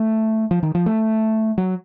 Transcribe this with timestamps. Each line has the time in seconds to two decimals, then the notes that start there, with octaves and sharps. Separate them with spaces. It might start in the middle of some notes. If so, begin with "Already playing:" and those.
Already playing: A3
0.51 F3
0.63 D#3
0.75 F3
0.86 A3
1.58 F#3